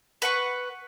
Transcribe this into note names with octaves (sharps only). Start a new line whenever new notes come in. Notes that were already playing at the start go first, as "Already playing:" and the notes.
B4 F#5 C#6